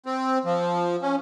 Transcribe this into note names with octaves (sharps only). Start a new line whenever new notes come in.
C4
F3
C#4